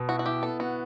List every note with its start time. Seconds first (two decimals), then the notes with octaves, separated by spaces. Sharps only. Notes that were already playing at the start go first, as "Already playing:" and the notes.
Already playing: B2 B3
0.09 E4 F#4
0.19 F#4
0.26 E4 G4
0.43 B3 A4
0.60 B3 F#4